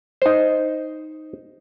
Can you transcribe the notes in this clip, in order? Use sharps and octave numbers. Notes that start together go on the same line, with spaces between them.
D#4 C5